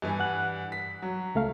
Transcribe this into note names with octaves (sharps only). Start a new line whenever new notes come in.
G2 E3 G#5
F#5 F#6
B6
F#3
C#2 A3 F5